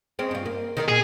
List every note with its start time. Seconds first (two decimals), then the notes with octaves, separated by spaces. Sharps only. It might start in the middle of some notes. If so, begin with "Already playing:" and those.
0.19 G#3 C4 C#4
0.31 G2 F4
0.46 A#3
0.77 D#3 C4 A#4
0.89 A#2 G#4